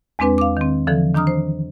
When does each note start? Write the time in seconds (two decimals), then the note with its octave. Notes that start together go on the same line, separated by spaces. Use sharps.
0.19 E2 G#3 C4 D4 B4 G#5
0.38 F5 D6
0.57 D#3 C4
0.87 D3 E3 F3 A4
1.14 D#3 D4 A#5 D#6 F6
1.27 C5